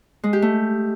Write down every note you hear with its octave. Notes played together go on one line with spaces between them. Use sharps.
G#3
G4
A3